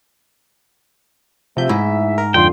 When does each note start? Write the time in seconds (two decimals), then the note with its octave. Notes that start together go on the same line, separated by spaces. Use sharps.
1.57 E2 C3 F3 A3 E5 G6
1.69 G#2 E4
2.18 A#4
2.34 F2 D3 F3 G5 C6